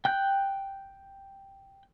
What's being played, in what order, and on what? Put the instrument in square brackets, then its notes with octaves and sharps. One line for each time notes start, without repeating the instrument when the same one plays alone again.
[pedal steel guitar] G5 F#6 G6